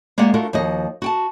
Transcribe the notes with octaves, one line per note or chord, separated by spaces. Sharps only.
G#3 A#3 G4 D5 F#5
A3 D4 F4 F#4 A#4
D#2 F3 F#4 D#5
F#4 G5 A5